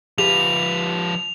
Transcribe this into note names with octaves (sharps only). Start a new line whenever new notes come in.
F3 G4 B4 F7